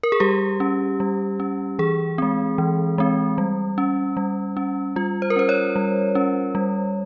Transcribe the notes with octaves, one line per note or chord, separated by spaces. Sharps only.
A#4
G#4
G3 G4
C#4
G3
C#4
E3 G#4
G#3 C4
E3
G#3 C4
G3
C#4
G3
C#4
G3 F4
C5
A#4
C#4 C5
C#5
G3
C#4
G3